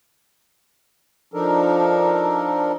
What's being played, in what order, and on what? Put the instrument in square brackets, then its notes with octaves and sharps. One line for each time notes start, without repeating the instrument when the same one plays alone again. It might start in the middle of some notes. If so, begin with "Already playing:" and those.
[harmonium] F3 D4 D#4 A4 A#4